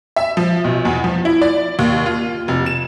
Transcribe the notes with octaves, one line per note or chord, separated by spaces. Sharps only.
E5
F3
B1
E2
F3
E4
D5
D#2
F4
F1
E7